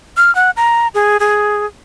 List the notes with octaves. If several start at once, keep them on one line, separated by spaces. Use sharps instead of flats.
F6
F#5
A#5
G#4
G#4